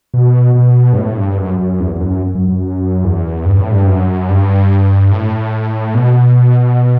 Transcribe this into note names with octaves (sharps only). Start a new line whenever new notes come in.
B2
B2
G2
A2
G2
F#2
F#2
E2
E2
F#2
F#2
F#2
E2
G2
A2
G2
F#2
G2
A2
B2